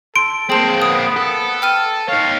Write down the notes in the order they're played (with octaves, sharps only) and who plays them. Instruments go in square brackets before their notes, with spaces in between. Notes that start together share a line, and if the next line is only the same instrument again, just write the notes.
[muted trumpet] A4 [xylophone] C6 [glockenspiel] D7
[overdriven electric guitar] A#3 C4 [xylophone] G#4 A5 [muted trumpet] C5
[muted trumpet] B3 [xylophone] D#6
[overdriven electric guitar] A4
[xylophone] G5 F6 D#7
[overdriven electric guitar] D#4 C#5 [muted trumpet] F5